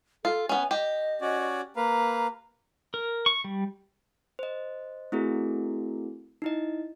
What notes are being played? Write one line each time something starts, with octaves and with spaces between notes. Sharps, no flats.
F4 A4
B3 C#4 G#5
G4 D#5
C#4 F#4 D5
A#3 B4 F5 A#5
A#4
C#6
G3
C5 D#5
A3 C4 E4 F#4 G#4 A#4
D#4 E4 D#5